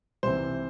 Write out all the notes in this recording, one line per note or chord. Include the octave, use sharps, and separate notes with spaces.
C2 C3 E3 C4 C5